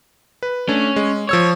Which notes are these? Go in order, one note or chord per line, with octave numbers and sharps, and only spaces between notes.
B4
A3 C#4 D4
G#3
F3 C#5 E6 G#6